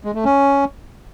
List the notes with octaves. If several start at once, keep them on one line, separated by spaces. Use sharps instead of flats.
G#3
A3
C#4